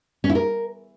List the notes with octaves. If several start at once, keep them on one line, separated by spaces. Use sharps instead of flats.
C#4
E4
A#4